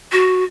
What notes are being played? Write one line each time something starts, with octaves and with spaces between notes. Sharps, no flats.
F#4